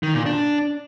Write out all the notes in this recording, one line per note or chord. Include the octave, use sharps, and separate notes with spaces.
D#3
A#2
D4